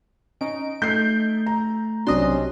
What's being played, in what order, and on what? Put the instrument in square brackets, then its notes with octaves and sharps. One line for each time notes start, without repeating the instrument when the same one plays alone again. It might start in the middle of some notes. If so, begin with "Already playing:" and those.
[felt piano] C#4 [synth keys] D#4 D7
[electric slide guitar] A3 [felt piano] G6 C7
[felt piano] A#5
[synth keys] B1 D#5 C6 [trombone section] C3 G3 C#4 [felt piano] F#3 D4